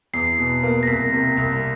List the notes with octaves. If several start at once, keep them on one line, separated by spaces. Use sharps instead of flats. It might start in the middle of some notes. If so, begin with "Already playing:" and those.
E2 C7
B2
A#3
A#6
C2 B6
C3
C2